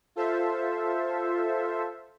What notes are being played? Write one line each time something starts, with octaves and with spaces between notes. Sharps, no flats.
F4 A4 C5 E5